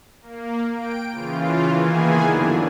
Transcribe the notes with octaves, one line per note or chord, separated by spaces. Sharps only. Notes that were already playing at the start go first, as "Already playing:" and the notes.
A#3
G5 D7
C#3 E3 F4
D#3 E3 A#3 B3 G#4 G#5
G2 D3 F#3 D4